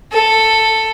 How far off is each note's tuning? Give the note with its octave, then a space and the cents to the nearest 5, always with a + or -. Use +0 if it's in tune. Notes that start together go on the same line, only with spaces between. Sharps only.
A4 +10